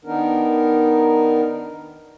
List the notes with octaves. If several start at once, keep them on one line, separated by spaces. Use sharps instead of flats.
D#3 B3 D4 D#4 A#4